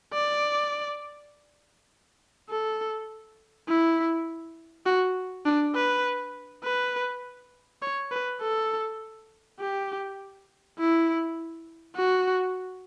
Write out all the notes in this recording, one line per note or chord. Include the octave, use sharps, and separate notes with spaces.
D5
A4
E4
F#4
D4
B4
B4
C#5
B4
A4
G4
E4
F#4